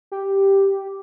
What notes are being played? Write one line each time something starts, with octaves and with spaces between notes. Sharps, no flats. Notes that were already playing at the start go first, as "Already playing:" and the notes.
G4